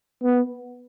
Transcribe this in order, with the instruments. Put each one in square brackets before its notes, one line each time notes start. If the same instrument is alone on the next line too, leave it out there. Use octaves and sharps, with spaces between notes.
[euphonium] B3